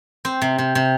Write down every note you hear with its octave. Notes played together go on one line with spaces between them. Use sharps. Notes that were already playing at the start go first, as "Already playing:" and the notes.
C4
C3
C3
C3